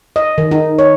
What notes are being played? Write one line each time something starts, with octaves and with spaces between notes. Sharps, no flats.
D#5
D#3
D#4
C#5